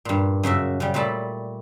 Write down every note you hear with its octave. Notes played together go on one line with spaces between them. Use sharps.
G2 A#2
F#2 C#3 F#4 E5
C#3 G3
A#2 G3 A3 A5 B5